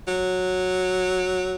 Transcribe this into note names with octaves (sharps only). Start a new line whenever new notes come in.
F#3